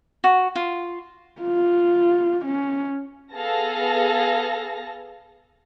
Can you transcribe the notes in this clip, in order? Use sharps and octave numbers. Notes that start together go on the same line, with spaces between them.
F#4
F4
F4
C#4
B3 G#4 A4 F5 A5 A#6